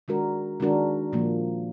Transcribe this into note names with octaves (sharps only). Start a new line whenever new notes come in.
D#3 G#3 D4 F#4 A#4
D#3 G#3 D4 F#4 A#4
A#2 F3 A#3